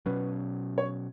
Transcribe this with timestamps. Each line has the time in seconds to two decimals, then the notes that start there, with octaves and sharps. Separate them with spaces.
0.06 B2 F#3 C#4 B4
0.78 C#5